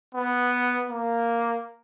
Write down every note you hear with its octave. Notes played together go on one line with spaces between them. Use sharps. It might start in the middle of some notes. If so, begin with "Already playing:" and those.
B3
A#3